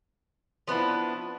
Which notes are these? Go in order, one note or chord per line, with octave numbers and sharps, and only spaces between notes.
F3 B3 D4 E4